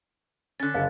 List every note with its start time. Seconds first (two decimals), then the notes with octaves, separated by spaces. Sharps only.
0.60 D3 C#4 F#6 A6
0.74 F#1 G#4 D#5 F5